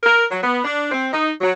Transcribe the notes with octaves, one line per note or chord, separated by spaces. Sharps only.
A#4
F#3
B3
D4
C4
D#4
F#3